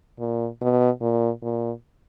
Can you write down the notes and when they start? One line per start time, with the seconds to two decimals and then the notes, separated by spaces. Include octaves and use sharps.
0.20 A#2
0.61 B2
1.01 A#2
1.43 A#2